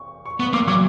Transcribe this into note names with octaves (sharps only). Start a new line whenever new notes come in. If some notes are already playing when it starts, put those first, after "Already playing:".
Already playing: C#6
C#6
B3 C#6
A#3 D6
F#3 D6